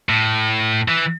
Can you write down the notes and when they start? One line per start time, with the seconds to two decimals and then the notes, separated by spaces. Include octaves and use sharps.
0.09 A2
0.88 E3